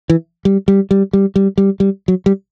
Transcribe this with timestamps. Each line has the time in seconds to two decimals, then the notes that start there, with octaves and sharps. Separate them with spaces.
0.10 E3
0.45 G3
0.68 G3
0.91 G3
1.13 G3
1.36 G3
1.58 G3
1.80 G3
2.08 F#3
2.26 G3